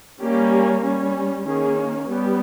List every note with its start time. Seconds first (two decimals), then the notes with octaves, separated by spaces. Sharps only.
0.20 G3 A#3 C#4 G4
0.83 G3 C#4
1.47 D#3 A#3 C#4 G#4
2.10 G3 B3 G4